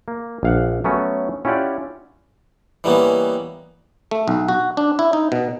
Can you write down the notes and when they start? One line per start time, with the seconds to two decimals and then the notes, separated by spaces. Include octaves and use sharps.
0.08 A#3
0.43 A#1 F5 F#5
0.84 F#3 A3 B3 C#4
1.45 C#4 E4 F4 G4 D5 F#5
2.84 E3 G3 A#3 B3 C#4
4.11 A3
4.28 B1
4.48 F#4
4.77 D4
4.99 E4
5.13 D#4
5.32 B2